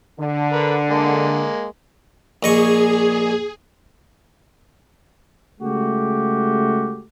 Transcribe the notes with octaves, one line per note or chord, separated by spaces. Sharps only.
D3
A#4 B4
G#3 A#3
A#1 G#4 D#5 C#6
C#3 G#3 A3 F#4 G4